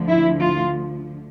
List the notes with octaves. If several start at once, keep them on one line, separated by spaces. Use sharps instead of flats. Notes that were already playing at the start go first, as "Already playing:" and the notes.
Already playing: D2 D3 F3
E4
F4